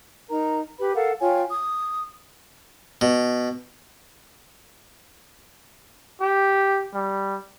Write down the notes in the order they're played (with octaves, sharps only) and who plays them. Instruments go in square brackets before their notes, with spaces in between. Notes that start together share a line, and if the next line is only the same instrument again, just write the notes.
[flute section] D#4 A#4 A#5
G4 B4 B5
A4 A#4 F5 F#5
F4 C#5 G5 G#5
D#6
[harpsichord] B2
[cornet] G4
G3